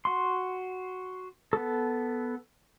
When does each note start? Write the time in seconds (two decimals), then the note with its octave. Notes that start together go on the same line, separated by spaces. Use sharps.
0.05 F#4 C6
1.53 B3 A4